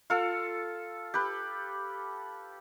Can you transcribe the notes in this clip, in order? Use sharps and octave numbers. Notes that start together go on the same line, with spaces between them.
F4 A4
G4 B4